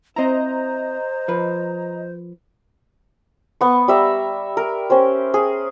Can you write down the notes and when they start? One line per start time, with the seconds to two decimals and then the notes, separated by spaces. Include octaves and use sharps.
0.16 C4 E4 C5 D#5 A#5
1.28 F3 B4
3.61 B3 C#6
3.88 G3 E5 A#5
4.57 A#4
4.90 C#4 G4 C5
5.34 G#4